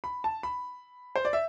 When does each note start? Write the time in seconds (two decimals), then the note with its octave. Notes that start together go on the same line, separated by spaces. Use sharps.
0.04 B5
0.24 A5
0.43 B5
1.16 C5
1.25 D5
1.33 E5